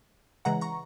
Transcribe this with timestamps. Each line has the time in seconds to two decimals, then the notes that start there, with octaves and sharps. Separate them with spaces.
0.45 C#3 E3 G#3 F#5 A#5
0.61 A#5 C#6